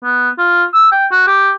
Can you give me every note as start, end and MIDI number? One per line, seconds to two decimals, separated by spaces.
0.03 0.30 59
0.38 0.64 65
0.73 0.91 88
0.92 1.07 79
1.12 1.27 66
1.27 1.51 67